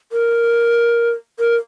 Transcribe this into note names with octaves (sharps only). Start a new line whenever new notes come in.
A#4
A#4